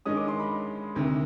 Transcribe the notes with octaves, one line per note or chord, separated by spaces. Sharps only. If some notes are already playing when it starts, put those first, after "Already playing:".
G2 D#3 G#3 C#4 D#6
D6
C6
B5
D2 C3 D#3